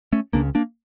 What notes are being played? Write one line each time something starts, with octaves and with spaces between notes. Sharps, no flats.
A3 C#4
C#2 C#3 A#3 D4
A#3 D4